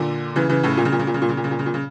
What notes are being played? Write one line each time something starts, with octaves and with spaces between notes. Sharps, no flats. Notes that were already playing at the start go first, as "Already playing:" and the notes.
Already playing: A#2 D3
C#3 E3
C#3 E3
A2 C#3
A#2
C#3
A#2
C#3
A#2
C#3
A#2
C#3
A#2
C#3
A#2
C#3
A#2
C#3